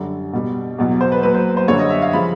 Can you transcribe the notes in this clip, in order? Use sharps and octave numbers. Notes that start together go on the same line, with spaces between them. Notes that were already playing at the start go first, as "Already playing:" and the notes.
Already playing: F#2 D3 G3
B2 G3
E2 B2 F#3
C5
B4
A#2 F#3 B4
C5
C5
F#2 D3 G3 C#5
D#5
E5
F5
C#3 F3 B5